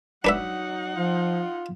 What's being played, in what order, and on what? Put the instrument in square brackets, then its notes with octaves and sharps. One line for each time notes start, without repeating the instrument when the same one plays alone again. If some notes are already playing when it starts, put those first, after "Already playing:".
[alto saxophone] F#3 [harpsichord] D4 B4 E5 [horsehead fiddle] D#4 F#5
[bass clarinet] F3 [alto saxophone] F4